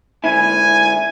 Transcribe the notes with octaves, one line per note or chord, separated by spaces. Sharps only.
G#2 D3 E4 G#5